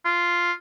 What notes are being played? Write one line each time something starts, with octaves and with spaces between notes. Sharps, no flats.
F4